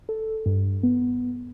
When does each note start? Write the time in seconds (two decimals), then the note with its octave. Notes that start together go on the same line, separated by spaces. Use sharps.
0.09 A4
0.46 G2
0.83 B3